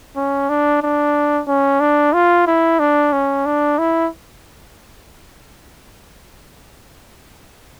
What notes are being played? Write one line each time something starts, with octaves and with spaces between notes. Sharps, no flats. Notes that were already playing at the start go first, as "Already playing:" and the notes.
C#4
D4
D4
C#4
D4
F4
E4
D4
C#4
D4
E4